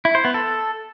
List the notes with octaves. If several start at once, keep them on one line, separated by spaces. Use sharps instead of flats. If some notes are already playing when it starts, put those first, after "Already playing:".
E4
C5
B3
A4